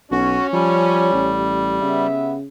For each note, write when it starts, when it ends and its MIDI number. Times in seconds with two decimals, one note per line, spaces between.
0.11 0.38 35
0.11 1.35 61
0.11 0.47 66
0.53 1.09 53
0.53 2.07 55
1.13 1.81 33
1.82 2.46 49
1.82 2.35 59
1.82 2.35 67
1.82 2.35 76